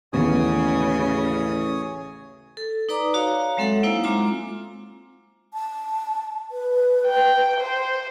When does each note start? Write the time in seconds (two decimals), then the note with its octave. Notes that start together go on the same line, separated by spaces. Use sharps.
0.13 A1 D#2 C#3 E3 B3 C#5 G#5 D#6
2.57 A4
2.89 D#4 B4 D5 A#5 D6 D#6
3.14 F#4 C#5 F5 A#5
3.57 F#3 G#3 C4 A4 E5 F#5
3.83 A#3 D#4 E4 C5 F5
4.04 G#3 C4 F4 A#5 D6
5.54 A5
6.51 B4
7.08 G5
7.61 C5